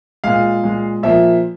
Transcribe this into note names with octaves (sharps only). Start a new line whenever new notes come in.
A#2 G#3 F5
A#2 G#3
A#2 F3 A#3 E5